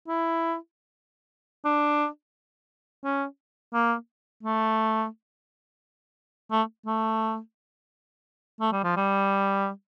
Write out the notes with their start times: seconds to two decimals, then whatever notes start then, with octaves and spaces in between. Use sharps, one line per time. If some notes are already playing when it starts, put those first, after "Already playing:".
0.08 E4
1.65 D4
3.04 C#4
3.74 A#3
4.43 A3
6.52 A3
6.86 A3
8.61 A3
8.72 G3
8.84 F3
8.97 G3